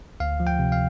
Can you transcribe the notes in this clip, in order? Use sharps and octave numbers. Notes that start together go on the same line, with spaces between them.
D2 F5
F3
G5
C3
F5